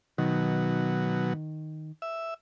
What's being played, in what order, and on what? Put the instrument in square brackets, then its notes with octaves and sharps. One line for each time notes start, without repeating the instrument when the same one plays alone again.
[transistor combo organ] B2 F#3 [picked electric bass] D#3
[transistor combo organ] E5